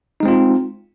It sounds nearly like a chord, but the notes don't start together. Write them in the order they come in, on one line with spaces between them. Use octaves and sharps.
D#4 G#3 C4 F4